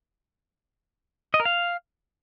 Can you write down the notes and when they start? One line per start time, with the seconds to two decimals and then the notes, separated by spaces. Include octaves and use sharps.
1.34 D#5
1.40 A#4
1.45 F5